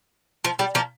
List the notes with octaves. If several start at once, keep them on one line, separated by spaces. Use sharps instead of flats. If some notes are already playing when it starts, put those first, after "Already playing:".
F3
G3
F3 A#3